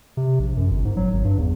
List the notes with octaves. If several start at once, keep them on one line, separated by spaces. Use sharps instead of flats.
C3
A#1
F#2
G1
G#2
F#3
G#1
G2
E2